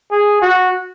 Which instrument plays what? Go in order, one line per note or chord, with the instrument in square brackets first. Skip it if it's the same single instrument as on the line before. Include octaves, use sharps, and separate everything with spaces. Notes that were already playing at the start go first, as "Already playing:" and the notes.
[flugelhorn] G#4
F#4